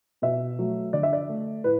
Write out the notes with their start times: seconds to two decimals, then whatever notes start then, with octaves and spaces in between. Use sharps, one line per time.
0.22 B2 E5
0.58 F#3 A3
0.93 D3 D5
1.03 E5
1.13 D5
1.29 A3
1.64 A2 B4